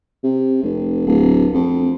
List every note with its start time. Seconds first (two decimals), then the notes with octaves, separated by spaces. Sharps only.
0.23 C3
0.63 F1
1.06 D1
1.53 F2